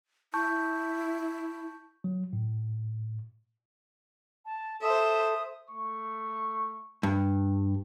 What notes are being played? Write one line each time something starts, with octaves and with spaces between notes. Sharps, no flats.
E4 A5 C#6 G6
F#3
A2
A5
A4 C5 E5 D#6
A3 C#6
G2